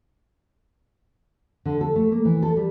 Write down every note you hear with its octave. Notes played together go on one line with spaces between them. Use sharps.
D3
A4
A3
A#3
E3
A4
G3